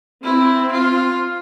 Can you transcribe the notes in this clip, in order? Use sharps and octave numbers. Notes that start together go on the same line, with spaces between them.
C4 E4
F4